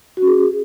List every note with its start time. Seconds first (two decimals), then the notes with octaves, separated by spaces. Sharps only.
0.17 F#4
0.22 C#4
0.27 G#4